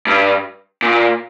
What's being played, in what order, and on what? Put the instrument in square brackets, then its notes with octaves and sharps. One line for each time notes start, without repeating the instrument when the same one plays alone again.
[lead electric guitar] G2
A#2